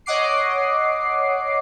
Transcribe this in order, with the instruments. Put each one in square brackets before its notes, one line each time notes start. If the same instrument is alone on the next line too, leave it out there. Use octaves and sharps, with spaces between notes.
[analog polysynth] C#5 D#5 F#5 D6 C7